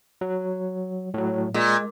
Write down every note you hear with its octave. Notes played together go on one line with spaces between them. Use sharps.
F#3
A2 F#3
A#2 G#3